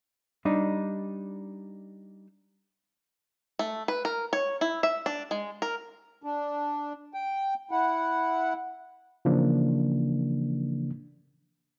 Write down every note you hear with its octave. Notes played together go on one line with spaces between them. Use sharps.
G3 D4 D#4
A3
B4
A#4
C#5
E4
E5
D4
G#3
A#4
D4
G5
E4 F#5
C#3 E3 F3 A#3 D4